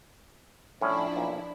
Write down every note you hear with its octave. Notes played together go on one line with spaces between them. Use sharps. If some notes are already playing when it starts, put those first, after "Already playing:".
A2 F3 C#4 D4 E4
B1 A#2